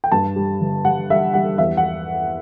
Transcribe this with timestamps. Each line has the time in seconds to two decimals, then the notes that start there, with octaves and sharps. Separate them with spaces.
0.04 G5
0.12 G2 A5
0.36 G3
0.61 G1
0.85 G3 F#5
1.10 G3 E5
1.34 G3 F#5
1.58 E2 E5
1.77 F#5